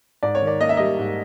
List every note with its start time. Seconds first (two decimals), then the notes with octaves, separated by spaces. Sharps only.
0.23 G#2 D5
0.35 C#5
0.42 D#3
0.47 D5
0.61 A#3 D#5
0.69 E5
0.77 G3 D#5
0.99 G#2